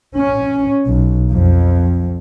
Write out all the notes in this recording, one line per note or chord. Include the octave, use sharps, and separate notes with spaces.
C#4
B1
F2